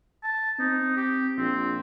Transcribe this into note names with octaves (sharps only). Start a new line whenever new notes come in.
A5
C4 D#4
G4
A#1 C4